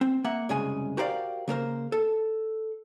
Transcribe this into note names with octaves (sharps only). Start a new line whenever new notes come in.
C4
A#3 E5 F#5
C2 F#2 C#3 G#3 G#5
F#4 G4 A#4 C5 D5 F5
C#3 A#3 A#4 C5
A4